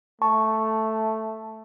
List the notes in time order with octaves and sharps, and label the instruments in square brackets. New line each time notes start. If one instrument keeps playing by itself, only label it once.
[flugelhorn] A3 [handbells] A5 C#6